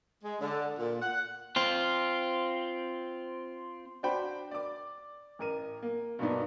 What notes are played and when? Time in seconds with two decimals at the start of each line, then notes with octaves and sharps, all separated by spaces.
0.23 G#3
0.41 D3
0.78 A#2
1.01 F#5
1.56 C4 F4
4.03 D4 F#4 C5 G5 B5
4.51 D5 D6
5.39 A1 A#4 D#7
5.82 A#3
6.19 G2 B2 A#3 B3 D4 D#4